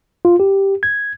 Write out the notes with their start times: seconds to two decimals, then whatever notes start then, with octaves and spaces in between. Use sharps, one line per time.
0.25 F4
0.40 G4
0.83 G#6